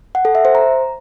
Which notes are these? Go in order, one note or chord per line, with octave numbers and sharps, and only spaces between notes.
F#5
A4
E5
C5
A#5